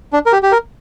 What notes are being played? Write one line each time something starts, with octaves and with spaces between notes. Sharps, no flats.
D4
A#4
G4
G4
A#4